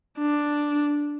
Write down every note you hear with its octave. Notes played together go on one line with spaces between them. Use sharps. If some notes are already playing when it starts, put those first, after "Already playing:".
D4